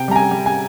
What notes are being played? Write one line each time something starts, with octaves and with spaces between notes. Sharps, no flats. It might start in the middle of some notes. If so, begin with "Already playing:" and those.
Already playing: C3 G5
G3 A#5
G#5
G3
G#5